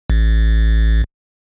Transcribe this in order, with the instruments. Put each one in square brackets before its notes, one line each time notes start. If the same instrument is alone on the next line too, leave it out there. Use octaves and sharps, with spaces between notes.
[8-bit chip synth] A1